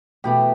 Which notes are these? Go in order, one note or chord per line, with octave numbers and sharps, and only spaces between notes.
E2 B2 A3 G4